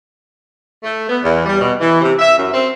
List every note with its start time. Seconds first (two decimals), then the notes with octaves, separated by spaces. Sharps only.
0.84 A3
1.10 B3
1.23 E2
1.46 G3
1.61 B2
1.81 E3
2.02 C3
2.19 E5
2.38 F#2
2.54 C4